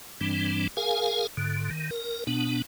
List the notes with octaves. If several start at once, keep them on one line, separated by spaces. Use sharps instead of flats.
G2 E3 G3 C4 D4
G#4 A#4 F5 G#5
G#2 D3
D#3
A#4
B2 B3 D4